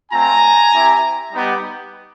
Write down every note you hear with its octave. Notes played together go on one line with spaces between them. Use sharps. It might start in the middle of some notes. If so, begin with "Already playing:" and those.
A3 C4 F4 G#5 A#5
C4 E4 G4
G3 B3 D#4 G4